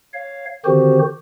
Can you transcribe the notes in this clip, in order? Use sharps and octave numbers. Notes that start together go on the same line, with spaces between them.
C#5 F5
D3 D#3 C4 F#4 G4 C5